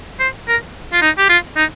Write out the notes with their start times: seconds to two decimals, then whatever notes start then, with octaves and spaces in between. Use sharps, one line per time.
0.20 C5
0.48 A#4
0.93 F4
1.02 D#4
1.18 G4
1.29 F4
1.57 D#4